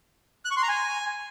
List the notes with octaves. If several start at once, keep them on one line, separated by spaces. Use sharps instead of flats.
F#6
C#6
C6
A#5
G#5